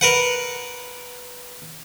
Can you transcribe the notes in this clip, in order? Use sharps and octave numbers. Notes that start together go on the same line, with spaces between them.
A#4 B4 F#5